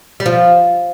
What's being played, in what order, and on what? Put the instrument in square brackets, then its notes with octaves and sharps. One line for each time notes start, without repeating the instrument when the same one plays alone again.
[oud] G3
F3